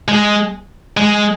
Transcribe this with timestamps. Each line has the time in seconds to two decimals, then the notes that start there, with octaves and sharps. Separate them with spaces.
0.08 G#3
0.97 G#3